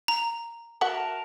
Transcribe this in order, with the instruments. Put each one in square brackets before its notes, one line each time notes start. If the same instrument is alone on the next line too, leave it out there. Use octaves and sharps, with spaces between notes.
[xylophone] A#5
[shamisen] F#4 E5 F#5 [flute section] A#4 A5